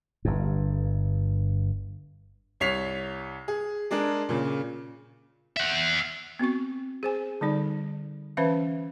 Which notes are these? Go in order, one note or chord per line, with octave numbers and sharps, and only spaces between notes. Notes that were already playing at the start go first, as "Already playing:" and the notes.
G1 G2
C2 C#5 B6 C7 F7
G#4
G#3 D4 G#4 A#4
A#2 C#3
E5 F#5
B3 C4 F#4 C#6
G#4 C5 G#5
D3 G3 D#4 D5
E3 C#4 B4 C5 E5 F5